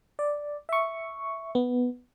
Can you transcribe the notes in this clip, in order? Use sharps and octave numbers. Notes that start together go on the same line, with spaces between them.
D5
E5 C#6
B3